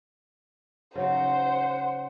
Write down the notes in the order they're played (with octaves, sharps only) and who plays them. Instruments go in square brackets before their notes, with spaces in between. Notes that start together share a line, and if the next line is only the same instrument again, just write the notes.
[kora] C#3 F#3 D#4 [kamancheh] C5 [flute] F#5